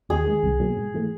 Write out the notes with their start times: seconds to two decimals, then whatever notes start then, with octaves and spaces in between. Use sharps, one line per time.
0.09 D#2 G#4
0.26 D#3 G#3
0.43 C2
0.60 B2 F#3 A#3
0.77 G#2
0.94 E3 A3